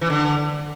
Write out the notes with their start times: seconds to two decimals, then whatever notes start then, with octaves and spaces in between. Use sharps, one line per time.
0.01 E3
0.10 D3